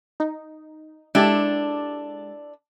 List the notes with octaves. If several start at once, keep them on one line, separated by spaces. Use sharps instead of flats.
D#4
G#3 D4 E4 G4 A4 A6